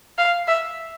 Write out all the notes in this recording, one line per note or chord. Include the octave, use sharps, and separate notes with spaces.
F5
E5